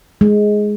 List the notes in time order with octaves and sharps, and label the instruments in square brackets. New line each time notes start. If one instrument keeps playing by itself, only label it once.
[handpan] G#3